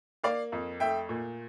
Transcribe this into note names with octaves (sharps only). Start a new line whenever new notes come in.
A#3 D5 F5
F2
A3 E5 G5
A#2